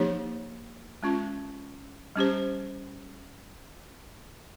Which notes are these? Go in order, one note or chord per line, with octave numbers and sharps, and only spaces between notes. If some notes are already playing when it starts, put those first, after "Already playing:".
Already playing: F3 A#3 D#4 G4 C#5
G#3 C#4 F4
G3 C#4 G4 C5